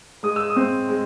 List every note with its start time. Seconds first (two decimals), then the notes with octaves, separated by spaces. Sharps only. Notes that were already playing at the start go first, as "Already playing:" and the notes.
0.23 G#3 D#6
0.36 E6
0.50 D#6
0.56 C4
0.89 G#3